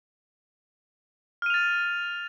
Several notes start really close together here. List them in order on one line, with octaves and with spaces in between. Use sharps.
F6 D#7 F7 A6